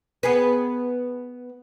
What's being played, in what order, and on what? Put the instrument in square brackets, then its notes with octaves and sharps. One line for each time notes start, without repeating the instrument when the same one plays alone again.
[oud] B3 G#4 B4